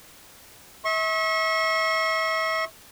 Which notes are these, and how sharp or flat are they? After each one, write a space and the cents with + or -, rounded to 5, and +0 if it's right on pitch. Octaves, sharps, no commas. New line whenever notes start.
E5 -40 C#6 -35